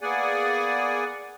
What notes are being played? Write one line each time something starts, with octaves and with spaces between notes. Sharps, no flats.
A#3 B3 G#4 D5 F#5 G#5